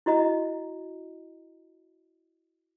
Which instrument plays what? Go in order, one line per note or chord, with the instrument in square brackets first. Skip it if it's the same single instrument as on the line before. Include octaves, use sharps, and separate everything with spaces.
[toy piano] E4 F#4 D#5 A#5